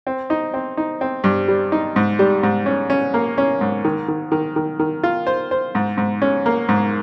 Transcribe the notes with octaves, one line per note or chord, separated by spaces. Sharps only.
C4
D#4
C4
D#4
C4
G2
G3
D#4
G#2
G3
G#2
C#4
C#4
A#3
C#4
G#2
D#3
D#3
D#3
D#3
D#3
F4
C5
C5
G#2
G#2
C#4
A#3
G#2